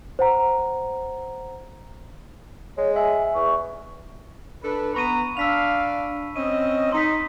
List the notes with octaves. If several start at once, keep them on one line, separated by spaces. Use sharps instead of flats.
C5 F#5 A#5
G#3 C#5
E5 G#5
E2 C#6
D4 A4 B4
B3 B4 A#5 B5 C#6 D#7
D4 F5 E6 B6 F7
C4 C#4 D#5 D#7
D#4 C6 B6